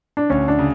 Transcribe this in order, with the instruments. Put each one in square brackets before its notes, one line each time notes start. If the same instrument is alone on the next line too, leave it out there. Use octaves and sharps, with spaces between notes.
[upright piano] D4
[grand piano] D2 [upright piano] C#4
[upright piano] D4
[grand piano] C#3